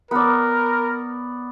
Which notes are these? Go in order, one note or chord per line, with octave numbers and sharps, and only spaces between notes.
B3 A#4 D5